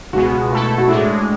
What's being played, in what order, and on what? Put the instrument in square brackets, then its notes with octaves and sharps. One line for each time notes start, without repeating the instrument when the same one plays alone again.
[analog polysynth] C#2 B2 G#3 B3 [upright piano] F#4
[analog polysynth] B2 A3 E4 A4
[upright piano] F#4
[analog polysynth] A2 G#3 D4 [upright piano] E4